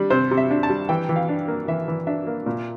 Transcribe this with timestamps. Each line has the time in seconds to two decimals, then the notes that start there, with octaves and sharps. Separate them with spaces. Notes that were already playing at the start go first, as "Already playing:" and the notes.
Already playing: G3 D4
0.10 C3 C5
0.31 C3
0.37 E5
0.51 D4
0.63 A5
0.70 G3
0.89 E3 G5
1.09 E3
1.16 F5
1.29 D4
1.48 A#3
1.68 E3 E5
1.88 E3
2.07 D4 E5
2.27 A#3
2.46 A#2